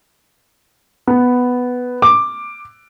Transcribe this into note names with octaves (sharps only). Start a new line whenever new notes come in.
B3
D6